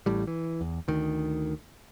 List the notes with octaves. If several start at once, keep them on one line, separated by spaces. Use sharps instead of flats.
A1 A2 G3
E3
E2
D2 D#3